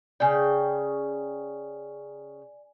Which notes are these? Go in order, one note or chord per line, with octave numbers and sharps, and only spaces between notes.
C#3 D5 G5 G#5